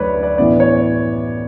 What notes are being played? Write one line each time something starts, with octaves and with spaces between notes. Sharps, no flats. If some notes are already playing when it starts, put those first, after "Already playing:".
Already playing: D2 D3 F#3 A3 B4 C#5 D5
D5
A2 E3 B3 D5
C#5